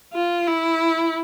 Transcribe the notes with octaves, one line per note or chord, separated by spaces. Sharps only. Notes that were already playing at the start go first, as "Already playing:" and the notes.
F4
E4